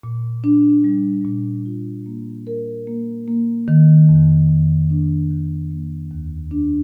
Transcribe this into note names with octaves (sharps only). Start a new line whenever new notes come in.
A#2
D4
G3
A#2
F4
A#3
A#4
A#3
A#3
D#3
F2
F2
D4
D#3
A#3
D#2
D4